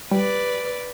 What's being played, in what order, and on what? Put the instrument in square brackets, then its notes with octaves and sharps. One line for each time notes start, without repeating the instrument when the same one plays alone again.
[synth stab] G3 [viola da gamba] B4 D5